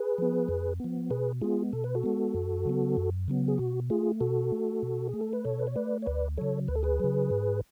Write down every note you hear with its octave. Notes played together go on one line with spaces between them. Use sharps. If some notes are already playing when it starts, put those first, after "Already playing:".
Already playing: G#4 B4
F3 B3
F2
F3 B3
B2 G#4 B4
G#3 B3 F4 G#4
B2 A4
B4
F#4 A4
G#3 B3
F#2
C#3 F#3 B3
F#2
C#3 F#3 B3
G#4
B2 F#4
A3 F4 G#4
B2 F#4 A4
A3
B2
A3 G#4
A4
B4
B2 A4 C#5
B4
C#5
A3 B4 D5
C#5
D2 B4 D5
C#3 F#3 A4 C#5
D2 B4
A4
G#4 B4
C#3 F#3
G#2